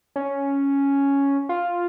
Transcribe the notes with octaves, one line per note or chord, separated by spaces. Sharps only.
C#4
F4